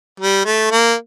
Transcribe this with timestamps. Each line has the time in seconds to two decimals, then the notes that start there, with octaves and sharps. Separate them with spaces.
0.20 G3
0.46 A3
0.71 A#3